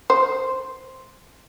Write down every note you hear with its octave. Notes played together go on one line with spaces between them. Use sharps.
C5